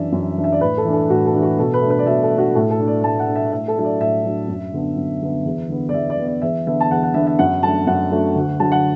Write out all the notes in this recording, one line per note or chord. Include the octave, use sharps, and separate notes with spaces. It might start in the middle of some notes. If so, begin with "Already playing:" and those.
Already playing: F#2 E3 D4 D5 E5
F#2
E3 D4
E5
D5
A2 B4
A4
E3 D4
A4
A2 F#4
A4
E3 D4
F#4
B2 A4
B4
A3 D4
B4
D5
B2 E5
A4
A3
D4 F#4
A2 A4
A4
A3 D4
D5
A2 A5
F#5
A3 D4
E5
A2 E5
A4
F#3 D4 E5
D5
A2 E5
F#3 D4
F#2
D3 B3 D4
F#2
D3 B3 D4
E2
D3 B3
D5
E2 E5
D5
D3 B3
D5
E2 E5
D3 B3 D4 E5
A5
E2 F#5
F#5
D3 B3 D4 E5
E5
F#2 F#5
F#3 A3 D4 A5
F#2 F#5
F#3 A3 D4
D2
D3 F#3 A5
F#5